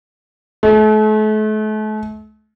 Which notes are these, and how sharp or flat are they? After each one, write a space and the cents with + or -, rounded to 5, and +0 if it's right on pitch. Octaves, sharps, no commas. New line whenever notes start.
A3 -40